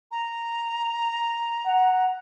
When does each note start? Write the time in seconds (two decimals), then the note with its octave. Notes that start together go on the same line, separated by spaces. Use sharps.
0.11 A#5
1.67 F#5